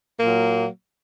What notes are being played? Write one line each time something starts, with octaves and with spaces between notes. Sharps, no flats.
A#2 F#3 A#3